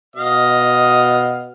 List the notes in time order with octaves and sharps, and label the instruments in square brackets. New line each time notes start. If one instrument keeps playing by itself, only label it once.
[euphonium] B2 [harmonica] D#5 F5